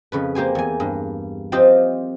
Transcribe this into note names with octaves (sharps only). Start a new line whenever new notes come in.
F2 C#3 B4
A#3 G4 C5 G#5
E2 G#5
G2
F3 C4 F4 G4 C5 D#5